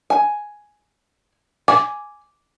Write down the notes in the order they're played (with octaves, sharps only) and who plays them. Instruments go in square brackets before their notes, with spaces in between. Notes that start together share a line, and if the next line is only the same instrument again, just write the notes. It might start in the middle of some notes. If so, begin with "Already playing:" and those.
[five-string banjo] G#5
[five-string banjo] G#5 [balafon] D6